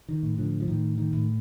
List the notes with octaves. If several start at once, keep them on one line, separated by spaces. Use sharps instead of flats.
D#3
A2
D3 F3
F3
A2 D#3
D#3
A2